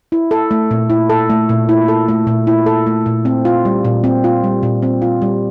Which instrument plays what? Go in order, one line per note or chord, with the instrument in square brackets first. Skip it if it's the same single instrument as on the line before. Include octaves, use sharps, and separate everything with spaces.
[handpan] E4
A4
A3
A#2
E4
A4
A3
A#2
E4
A4
A3
A#2
E4
A4
A3
A#2
C4
F4
G3
A#2
C4
F4
G3
A#2
C4
F4
G3